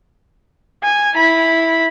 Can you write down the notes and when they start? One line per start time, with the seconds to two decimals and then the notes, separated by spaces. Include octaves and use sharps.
0.83 G#5
1.15 E4 B5